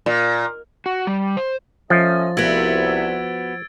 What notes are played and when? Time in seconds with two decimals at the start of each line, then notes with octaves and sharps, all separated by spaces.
0.06 A#2
0.86 F#4
1.07 G3
1.37 C5
1.90 F3 A3 C#4 D#5 A6
2.37 C2 B3 F#4 E5 E6 G#6 D7
3.02 G#6